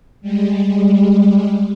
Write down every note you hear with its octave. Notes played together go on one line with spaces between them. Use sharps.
G3 G#3